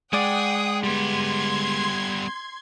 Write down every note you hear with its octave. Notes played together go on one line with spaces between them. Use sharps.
G#3 G#4 D5 F#5 G5 D#6
G3 B3 C6 G#6